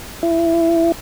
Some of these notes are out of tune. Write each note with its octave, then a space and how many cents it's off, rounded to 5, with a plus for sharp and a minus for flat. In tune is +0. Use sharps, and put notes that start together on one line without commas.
E4 +20